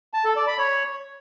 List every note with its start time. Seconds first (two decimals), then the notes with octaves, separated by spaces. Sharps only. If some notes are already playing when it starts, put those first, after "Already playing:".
0.14 A5
0.25 A4
0.36 D5
0.47 B5
0.59 C#5